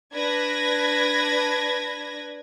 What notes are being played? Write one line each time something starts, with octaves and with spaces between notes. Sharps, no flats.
D4 B4 G#6 A#6